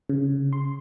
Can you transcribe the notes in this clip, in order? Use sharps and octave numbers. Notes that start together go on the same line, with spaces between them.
C#3
C6